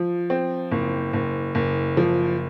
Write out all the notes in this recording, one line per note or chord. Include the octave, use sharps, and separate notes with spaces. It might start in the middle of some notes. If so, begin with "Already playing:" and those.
Already playing: F3
C4
F#1
F#1
F#1
F3